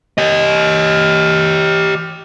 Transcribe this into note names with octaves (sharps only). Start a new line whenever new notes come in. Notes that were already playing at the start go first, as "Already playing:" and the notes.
G4 D#5